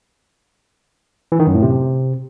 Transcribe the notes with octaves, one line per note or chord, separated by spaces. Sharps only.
E3
D#3
F#2
A2
C3